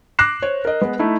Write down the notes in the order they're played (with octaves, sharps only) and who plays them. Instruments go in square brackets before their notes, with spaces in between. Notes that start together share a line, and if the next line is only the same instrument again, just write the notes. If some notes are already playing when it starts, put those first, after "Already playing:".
[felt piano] D6 F#6 A#6 C7 E7
C5 C#5
A#4 D#5
G#3 B3
A3 D#4 E4